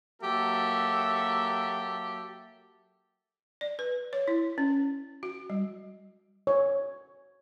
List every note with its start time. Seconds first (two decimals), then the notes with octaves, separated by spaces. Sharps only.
0.22 F#3 A#3 F#4 G4 A4 E5
3.61 D5
3.79 B4
4.13 C#5
4.28 E4
4.58 C#4
5.23 F#4
5.50 G3
6.47 C#5